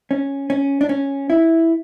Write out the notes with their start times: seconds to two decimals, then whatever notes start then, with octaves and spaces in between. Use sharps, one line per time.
0.11 C#4
0.50 C#4
0.81 D4
0.89 C#4
1.30 E4